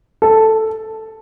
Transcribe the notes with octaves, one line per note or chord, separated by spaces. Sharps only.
A4